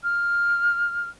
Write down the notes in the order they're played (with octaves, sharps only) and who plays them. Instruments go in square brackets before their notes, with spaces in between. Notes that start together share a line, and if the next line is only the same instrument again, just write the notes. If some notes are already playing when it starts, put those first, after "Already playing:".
[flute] F6